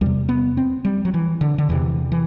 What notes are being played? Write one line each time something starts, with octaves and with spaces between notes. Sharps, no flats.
E2 C3 G3
B3
C4
G3
F#3
E3
D3
D3
E2 C3 E3
E3